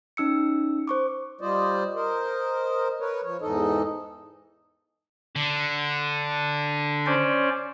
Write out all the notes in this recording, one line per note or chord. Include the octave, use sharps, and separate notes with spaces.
C#4 D#4 E6 C#7
C5 C#6 D6
G3 F4 C5 D5 D#5
A#4 C5 D#5
A#4 B4 C#5
F3 C#5
E2 G#2 E3 D#4 A4 D#5
D3
C#4 C5 D5